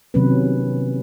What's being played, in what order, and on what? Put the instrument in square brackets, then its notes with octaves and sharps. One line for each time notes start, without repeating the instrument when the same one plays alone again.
[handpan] C3 D#3 F#3 B3 C#4 B4